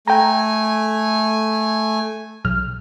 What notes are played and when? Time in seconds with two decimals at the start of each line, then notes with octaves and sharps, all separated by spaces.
0.07 A3 G5 G#5 A#5
2.45 B1 F6